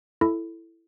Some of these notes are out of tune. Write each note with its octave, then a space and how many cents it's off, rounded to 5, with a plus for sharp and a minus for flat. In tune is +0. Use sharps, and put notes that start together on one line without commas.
E4 +10 A4 +0 B5 +15